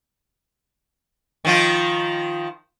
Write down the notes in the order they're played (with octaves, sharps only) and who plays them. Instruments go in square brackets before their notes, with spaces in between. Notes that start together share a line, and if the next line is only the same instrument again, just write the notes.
[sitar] D#3 F3 F4